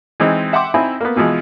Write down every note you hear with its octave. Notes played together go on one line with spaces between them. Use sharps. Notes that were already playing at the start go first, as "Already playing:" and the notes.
E3 G#3 C4 D#4
E5 F#5 G5 C6 D6
C4 D#4 E4 D#5 G#5 B5
A#3 B3
B2 E3 F3 G#3